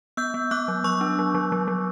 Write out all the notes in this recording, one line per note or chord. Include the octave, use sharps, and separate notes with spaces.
B3 E6 G6
B3
B3 D6 F#6
F#3
F#3 C#6 E6
D4
F#3
F#3
F#3
F#3